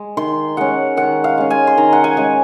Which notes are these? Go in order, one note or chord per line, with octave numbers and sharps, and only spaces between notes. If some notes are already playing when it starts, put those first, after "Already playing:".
Already playing: G#3
D#3 C6
G#3 C#4 F#5
D#3 F#5
F5
G#3 C#4
G#5
C6
D#3 A#5
F#5
G#5
G#3 C#4